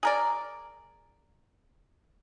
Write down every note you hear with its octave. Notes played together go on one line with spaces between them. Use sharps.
G#4 A#4 D5